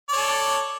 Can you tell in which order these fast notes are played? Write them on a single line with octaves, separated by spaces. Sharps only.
D5 C#5 A4